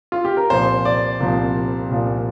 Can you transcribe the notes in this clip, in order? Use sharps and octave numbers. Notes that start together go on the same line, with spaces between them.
F4
G4
A#4
C2 A#2 F3 C5
D5
C2 A#2 F3
C2 A#2 F3